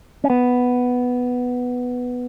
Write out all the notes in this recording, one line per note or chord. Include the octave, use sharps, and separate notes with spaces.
C#4
B3